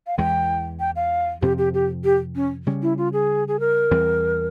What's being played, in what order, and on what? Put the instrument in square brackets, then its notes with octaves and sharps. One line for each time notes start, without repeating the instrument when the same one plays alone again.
[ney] F5
[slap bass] E2 E3 G#3 [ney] G5
[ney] G5
F5
[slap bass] F2 C3 F3 C4 [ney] G4
[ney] G4
G4
G4
C#4
[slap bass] C#3 G3 C#4
[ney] E4
F4
G#4
G#4
A#4
[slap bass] E2 E3 G3 C4